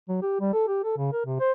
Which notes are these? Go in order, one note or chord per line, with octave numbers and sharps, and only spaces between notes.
F#3
G4
G3
A4
G4
A4
C#3
A#4
C3
C5